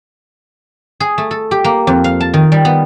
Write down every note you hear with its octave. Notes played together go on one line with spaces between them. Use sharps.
G#4
A3
A4
G4
A#3
F2
F5
A5
D#3
G3
B3